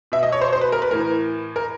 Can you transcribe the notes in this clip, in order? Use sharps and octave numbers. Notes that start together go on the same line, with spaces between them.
B2 E5
D#5
C#5
C5
C5
B4
A#4
B4
A2 E3 A#4
A#4